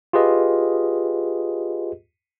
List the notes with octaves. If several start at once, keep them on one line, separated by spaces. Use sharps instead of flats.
F4 G4 G#4 B4 D#5